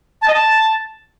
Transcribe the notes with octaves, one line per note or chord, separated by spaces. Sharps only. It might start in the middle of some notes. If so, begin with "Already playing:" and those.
A5
D#5
A5